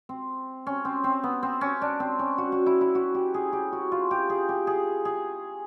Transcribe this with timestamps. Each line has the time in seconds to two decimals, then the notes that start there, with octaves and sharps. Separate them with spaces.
0.09 C4
0.66 C#4
0.85 C4
1.04 C4
1.24 B3
1.43 C4
1.61 C#4
1.82 D4
2.00 C4
2.19 C#4
2.38 F#4
2.52 F#4
2.66 E4
2.81 E4
2.95 F#4
3.14 G4
3.34 G#4
3.53 G4
3.72 F#4
3.92 F4
4.11 G4
4.30 G#4
4.49 G4
4.67 G#4
5.05 G#4